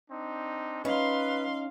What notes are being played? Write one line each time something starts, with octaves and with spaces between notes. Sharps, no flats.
C4 D4 D#4
C#4 D#4 B4 F5 C6